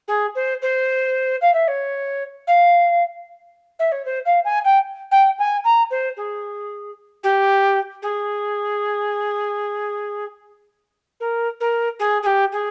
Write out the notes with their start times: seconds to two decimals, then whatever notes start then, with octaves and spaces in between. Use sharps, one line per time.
0.07 G#4
0.35 C5
0.62 C5
1.41 F5
1.53 E5
1.67 C#5
2.47 F5
3.79 E5
3.91 C#5
4.05 C5
4.25 F5
4.44 G#5
4.64 G5
5.11 G5
5.38 G#5
5.64 A#5
5.90 C5
6.17 G#4
7.23 G4
8.02 G#4
11.20 A#4
11.60 A#4
11.99 G#4
12.22 G#4
12.26 G4
12.52 G#4